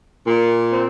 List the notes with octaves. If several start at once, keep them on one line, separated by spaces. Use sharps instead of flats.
A#2
C4